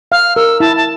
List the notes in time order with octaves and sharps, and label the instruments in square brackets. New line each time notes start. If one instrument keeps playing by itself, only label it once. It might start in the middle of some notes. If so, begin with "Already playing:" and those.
[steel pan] F5 [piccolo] F6
[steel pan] A#4 [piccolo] E6
[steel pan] E4 [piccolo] A5
[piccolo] A5